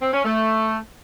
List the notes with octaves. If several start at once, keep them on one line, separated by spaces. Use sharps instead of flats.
C4
C#4
A3